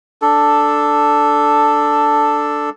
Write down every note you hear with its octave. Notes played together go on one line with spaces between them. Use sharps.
D4 A4